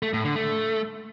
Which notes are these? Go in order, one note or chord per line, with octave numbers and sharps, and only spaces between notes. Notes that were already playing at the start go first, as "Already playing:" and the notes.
A3
A2
D3
A3